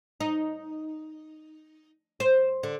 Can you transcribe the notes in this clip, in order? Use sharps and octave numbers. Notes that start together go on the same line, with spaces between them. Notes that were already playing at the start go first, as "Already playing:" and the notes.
D#4
C5
D3